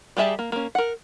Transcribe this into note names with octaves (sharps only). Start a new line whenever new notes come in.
G3 G4 G#4 E5 A5
A#3
A#3 C#4
A#4 F#5